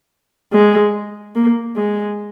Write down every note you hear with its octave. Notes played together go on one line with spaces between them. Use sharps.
G#3
A#3
G#3